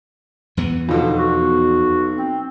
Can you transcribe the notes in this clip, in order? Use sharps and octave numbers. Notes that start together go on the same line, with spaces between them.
E2 E3 B3
B1 F2 B2 D3
F#4
C4